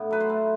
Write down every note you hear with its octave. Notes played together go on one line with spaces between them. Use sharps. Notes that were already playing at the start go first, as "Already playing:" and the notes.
Already playing: A2 B3 D4
F#3 B4
C5
A3